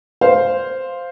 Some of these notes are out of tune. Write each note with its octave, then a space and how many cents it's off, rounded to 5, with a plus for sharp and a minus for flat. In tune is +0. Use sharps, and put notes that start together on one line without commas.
C5 +0 F5 +0